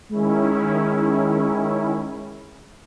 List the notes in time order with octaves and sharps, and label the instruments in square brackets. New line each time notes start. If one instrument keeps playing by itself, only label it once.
[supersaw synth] D#3 C#4 E4 [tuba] G#3